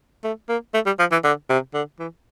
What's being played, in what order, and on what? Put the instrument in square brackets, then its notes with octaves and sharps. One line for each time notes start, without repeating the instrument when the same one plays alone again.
[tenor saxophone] A3
A#3
A3
G3
F3
E3
D3
C3
D3
E3